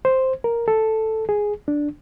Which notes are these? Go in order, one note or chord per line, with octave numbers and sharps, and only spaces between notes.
C5
A#4
A4
G#4
D4